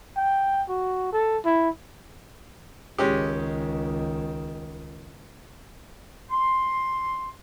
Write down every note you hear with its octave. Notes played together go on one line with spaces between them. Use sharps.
G5
F#4
A4
E4
C#2 D#3 G#3 C#4 G4
C6